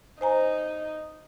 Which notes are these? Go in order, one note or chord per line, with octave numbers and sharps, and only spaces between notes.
D#4 C5 G#5 A#5